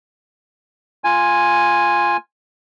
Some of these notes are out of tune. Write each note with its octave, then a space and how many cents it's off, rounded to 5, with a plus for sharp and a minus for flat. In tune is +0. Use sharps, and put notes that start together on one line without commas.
F4 +0 G#5 -5